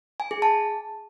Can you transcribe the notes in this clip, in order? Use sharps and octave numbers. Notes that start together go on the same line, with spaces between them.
G#5
G#4
A5